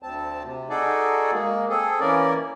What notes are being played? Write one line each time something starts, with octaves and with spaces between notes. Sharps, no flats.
D2 C4 A5
C3
D#4 F#4 G#4 A4 D5
G#3 A#3
C4 G#4 A4
E3 A#3 C#4 A#4 D5